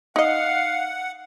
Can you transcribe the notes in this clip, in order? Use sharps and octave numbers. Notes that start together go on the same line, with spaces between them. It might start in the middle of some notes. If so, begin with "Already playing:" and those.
D#4 D#5 F5 F#5